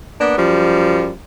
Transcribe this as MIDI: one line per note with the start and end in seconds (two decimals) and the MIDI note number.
0.21 0.34 58
0.21 0.34 59
0.21 0.34 62
0.38 1.11 42
0.38 1.11 53
0.38 1.11 55